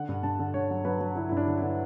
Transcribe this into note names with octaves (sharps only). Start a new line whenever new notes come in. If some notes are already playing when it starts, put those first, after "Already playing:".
Already playing: D3 F#5
G2
G2 A5
D3
G2 C#5
F#3
F#3 B4
F#3
D3 E4
G2 E4
D4
D3
D3 E4